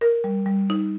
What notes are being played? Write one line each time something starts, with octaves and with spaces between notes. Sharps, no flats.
A#4
G3
G3
D#4